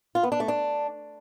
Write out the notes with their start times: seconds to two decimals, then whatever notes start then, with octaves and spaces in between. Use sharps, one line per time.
0.15 F4
0.23 B3
0.32 D4
0.40 A3
0.48 D4